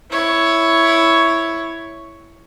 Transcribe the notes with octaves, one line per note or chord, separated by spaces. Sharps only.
E4 C#5